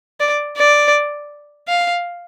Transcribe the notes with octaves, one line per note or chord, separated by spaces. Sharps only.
D5
D5
F5